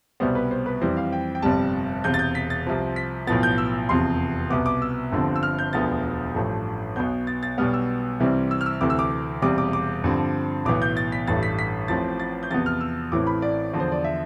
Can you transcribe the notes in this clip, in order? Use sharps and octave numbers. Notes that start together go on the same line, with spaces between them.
C2 B2 G3 B3 C5
B4
C5
B4
F2 E3 G3 C4 C5
F5
G5
G5
G1 F2 C3 G3 A5
E1 E2 C3 G6
A6
G6
B6
A6
C2 C3 F3 C4
B6
B1 A2 F3 B3 A6
G6
E6
F1 E2 C3 F3 C6
C2 B2 B3 D6
D6
E6
G1 G2 D3 F3 C4
E6
F6
G6
E1 D2 D3 F3 B3 A6
A1 G2 F3 A3
B1 B2 B3 G6
A6
A6
B1 B2 G3 B3 F6
E6
C2 C3 E3 G3 C4
E6
F6
E6
D2 C3 E3 A3 D6
E6
D6
E1 E2 C3 G3 D6
D6
D6
G2 D3 F3 C4
B1 A2 E3 B3 D6
G6
A6
B6
A1 G2 E3 A3 A6
B6
B6
A1 A2 F3 C4 A6
A6
G6
E2 C3 F3 B3 A6
F6
E6
A1 A2 E3 A3 C4 D6
B5
D5
E2 D3 F3
C5
D5
E5